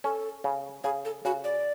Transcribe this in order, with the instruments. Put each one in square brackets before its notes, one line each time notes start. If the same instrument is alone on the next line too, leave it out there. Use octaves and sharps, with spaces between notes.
[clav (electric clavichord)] C#4 [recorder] A4
[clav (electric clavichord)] C#3
[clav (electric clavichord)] C#3 [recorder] G#4
[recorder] A4
[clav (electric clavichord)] C#3 [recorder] F#4
[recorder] D5